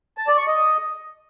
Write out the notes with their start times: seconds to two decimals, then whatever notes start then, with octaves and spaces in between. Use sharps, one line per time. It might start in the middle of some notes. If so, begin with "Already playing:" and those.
0.18 A5
0.27 D5
0.37 C#6
0.47 D#5